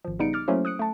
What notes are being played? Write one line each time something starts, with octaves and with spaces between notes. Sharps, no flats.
G#1 F3
C#3 G3 B3 D#4 C#7 D7
D6 F6 A6
F#3 A3 A#3 C#4 E4 C5
D#6 F#6 C#7 D7
A3 A5